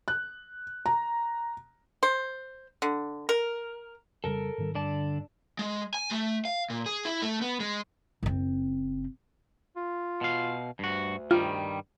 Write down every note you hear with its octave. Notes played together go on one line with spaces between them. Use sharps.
F#6
A#5
C5
D3
A#4
F2 C#3 G3 A4 A#4
G#2 D#3 G3
G2 D3 D5 A5
G#3
G#5
A3
F5
A#2
G#4
E4
A3
B3
G#3
F#1 C4
F4
B2 F5
D2 G2 F#4
G2 D#3 G3 F4